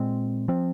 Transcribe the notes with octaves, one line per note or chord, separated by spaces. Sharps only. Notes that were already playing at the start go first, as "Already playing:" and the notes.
Already playing: A#2 G#3 C4
F3 C4